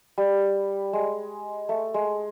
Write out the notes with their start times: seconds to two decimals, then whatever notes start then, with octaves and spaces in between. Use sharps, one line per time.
0.18 G3
0.93 G#3
1.69 A3
1.94 G#3